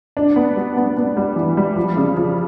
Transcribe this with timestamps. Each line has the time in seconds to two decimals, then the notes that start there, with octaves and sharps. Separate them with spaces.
0.17 D4
0.36 B3
0.56 G3
0.77 B3
0.97 B3
1.17 G3
1.36 E3
1.57 G3
1.76 F3
1.97 C#3
2.17 F3